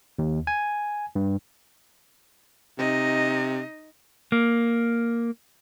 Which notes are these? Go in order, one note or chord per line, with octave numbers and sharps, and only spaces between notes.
D#2
G#5
G2
C3 D#4 D#5
A#3